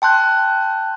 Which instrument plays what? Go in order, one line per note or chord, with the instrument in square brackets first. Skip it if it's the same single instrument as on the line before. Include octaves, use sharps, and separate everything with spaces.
[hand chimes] G5 A5 C6 F#6 G6